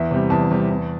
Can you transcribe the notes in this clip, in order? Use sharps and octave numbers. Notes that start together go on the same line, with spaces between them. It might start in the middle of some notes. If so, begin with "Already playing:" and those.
Already playing: E2 E5
C3 G3
E2 A5
C3 G3
E2